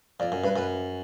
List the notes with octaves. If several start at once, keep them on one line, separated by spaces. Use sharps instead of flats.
F2 D5
F#2
G2 B4
F#2 B4